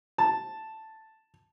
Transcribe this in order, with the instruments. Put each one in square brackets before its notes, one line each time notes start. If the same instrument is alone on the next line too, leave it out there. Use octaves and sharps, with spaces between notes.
[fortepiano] A5